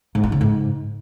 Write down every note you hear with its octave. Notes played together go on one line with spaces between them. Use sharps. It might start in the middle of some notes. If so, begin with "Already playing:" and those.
G#2
F3
C#3
G#2